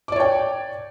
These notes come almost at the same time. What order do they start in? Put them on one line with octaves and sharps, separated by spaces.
D6 D5 C#5 G5